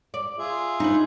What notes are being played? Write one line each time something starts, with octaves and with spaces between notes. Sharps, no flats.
D5
F4 G#4 E5
D#4 B4